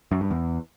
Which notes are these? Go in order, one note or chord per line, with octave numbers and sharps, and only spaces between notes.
F#2
G2
E2